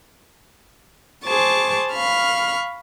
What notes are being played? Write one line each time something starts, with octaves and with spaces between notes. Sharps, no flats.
G#4 C5 A5 C#6 D6
F5 B5 C#6 F6